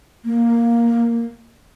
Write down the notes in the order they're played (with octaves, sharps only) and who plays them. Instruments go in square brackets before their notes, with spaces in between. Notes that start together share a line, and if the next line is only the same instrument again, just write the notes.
[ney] A#3